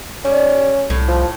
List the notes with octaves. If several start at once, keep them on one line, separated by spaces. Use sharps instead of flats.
G3 C#4
C2 A2
F3